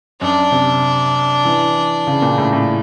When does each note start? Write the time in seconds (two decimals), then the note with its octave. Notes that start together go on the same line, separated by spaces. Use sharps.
0.21 F#2 D4
0.52 C3
1.45 E3
2.07 C#3
2.22 A#2
2.38 A2
2.53 A2